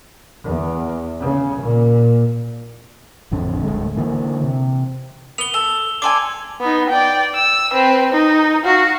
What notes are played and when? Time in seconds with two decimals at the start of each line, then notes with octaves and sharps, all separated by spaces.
0.44 E2
1.20 C#3
1.61 A#2
3.31 A1 F2 D3
3.63 D1 C2 G#3 A3
3.97 D3 E3 A#3
4.44 C3
5.38 B3 F7 G7
5.54 A4
6.02 D4 A4 G#5 C6 D6
6.61 B3 D#4
6.89 D5 G5
7.35 E6
7.72 C4 B4
8.12 D#4
8.64 F#4 F5